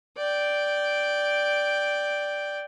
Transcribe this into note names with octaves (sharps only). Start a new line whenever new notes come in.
D5 G5